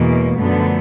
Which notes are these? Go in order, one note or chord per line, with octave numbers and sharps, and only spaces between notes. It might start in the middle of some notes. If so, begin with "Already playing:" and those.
Already playing: E2 B2 G#3 A#3
F#2 D3 F3 A3 B3